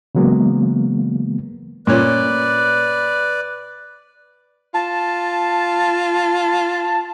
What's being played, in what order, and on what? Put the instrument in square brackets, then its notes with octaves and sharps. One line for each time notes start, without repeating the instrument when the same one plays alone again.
[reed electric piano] C#3 E3 F#3 G#3 A#3 B3
[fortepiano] A#2 C#4 [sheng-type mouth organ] B4 D5
[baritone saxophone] F4 [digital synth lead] A5